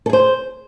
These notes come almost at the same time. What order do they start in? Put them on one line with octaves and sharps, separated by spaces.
A4 G#4 C5